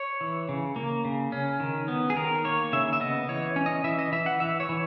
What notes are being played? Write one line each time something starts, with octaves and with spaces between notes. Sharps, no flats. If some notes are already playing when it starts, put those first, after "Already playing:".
Already playing: C#5
E3
C#3
A#3
C#3
C#4
D#3
B3
G#4
D#3 A#4
A#3 C#5
C#3 E5
E5
B3 D#5
E3 C#5
C#4
D#5
E3 E5
D#5
E3 E5
F#5
E3 E5
C#5
E3